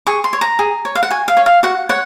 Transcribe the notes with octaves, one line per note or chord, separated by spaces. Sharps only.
G#4 C#6
C6
C#5
A#5
G#4
C#5
F5
F#5
F#4 G#5
F5
C#5
F5
F#4 F#5
C#5 F#5